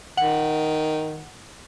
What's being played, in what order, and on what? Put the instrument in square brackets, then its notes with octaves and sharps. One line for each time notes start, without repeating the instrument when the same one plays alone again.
[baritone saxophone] D#3 [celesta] F#5 F#7